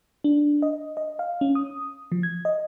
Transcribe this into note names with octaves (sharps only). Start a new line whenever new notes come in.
D4
D#5
D#5
F5
C#4
D#6
F3
G#6
D#5